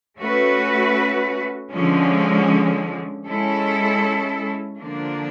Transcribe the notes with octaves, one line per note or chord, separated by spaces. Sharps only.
A3 C#4 F#4 B4
D3 F3 G#3 C#4
G#3 C#4 E4 A4
D3 F3 A#3 D4